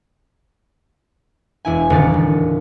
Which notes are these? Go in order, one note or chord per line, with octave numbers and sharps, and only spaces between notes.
E1 E4 G#5
D#1 A2 D3 D5 A6 C#7
D#1